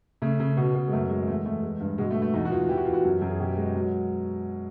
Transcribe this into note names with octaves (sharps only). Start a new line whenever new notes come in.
C#3 A3
C#3
B2
B2
G#3
F#2 A3
G#3
E2 A3
E2 A3
G#3
G2
B2 G#3
A3
B2
A3
E2 D#4
F#4
E2 F4
E3 G4
F#4
E2 F4
F#4
F#2
F#2
G#4
B2 G4
G#3
F#3